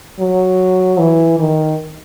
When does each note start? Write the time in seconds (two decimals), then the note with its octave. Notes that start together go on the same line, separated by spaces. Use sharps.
0.20 F#3
0.99 E3
1.39 D#3